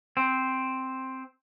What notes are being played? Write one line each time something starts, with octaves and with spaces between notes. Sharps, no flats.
C4